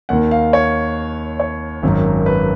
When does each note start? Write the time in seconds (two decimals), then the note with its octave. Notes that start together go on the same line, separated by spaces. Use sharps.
0.09 D#2 D#3 F#5
0.31 F5
0.53 C#5
1.40 C#5
1.83 G#1 F#2 D#3
2.26 B4